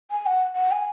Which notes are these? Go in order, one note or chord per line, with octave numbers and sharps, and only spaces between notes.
G#5
F#5
F#5
G#5